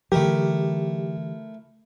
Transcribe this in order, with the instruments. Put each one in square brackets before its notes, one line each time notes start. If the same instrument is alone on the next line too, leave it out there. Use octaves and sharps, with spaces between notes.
[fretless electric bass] D3 E3 F#3 [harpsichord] A3 E4 A#4 [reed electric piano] G4